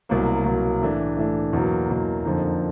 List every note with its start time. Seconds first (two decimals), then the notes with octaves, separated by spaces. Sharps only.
0.09 C2 B2 F#3 A#3
0.45 C2 B2 F#3 A#3
0.81 A2 E3 A3 D4
1.17 A2 E3 A3 D4
1.53 E2 B2 F#3 A#3
1.89 E2 B2 F#3 A#3
2.25 F2 D3 F3 A#3 D#4